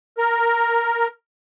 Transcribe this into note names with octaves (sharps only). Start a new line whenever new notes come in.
A#4